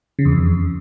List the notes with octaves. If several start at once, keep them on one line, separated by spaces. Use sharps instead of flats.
C#3
E2
F2